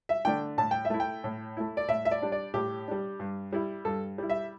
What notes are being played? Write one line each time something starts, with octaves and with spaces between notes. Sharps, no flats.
E5
D3 A3 D4 G5
A2 A5
G5
E5
A3 E4
G5
A2
A3 E4
D5
A2 E5
E5
D5
G3 D4
D5
A2 G4
G3 D4
G2
G3 E4
G2 A4
G3 E4
E5